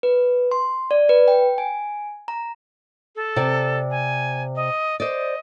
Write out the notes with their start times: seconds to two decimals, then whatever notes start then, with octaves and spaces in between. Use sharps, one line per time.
0.03 B4
0.51 C6
0.91 D5
1.09 B4
1.28 G5
1.58 G#5
2.28 A#5
3.16 A4
3.36 C3 D5
3.91 G#5
4.56 D#5
5.00 C5 D5 D#5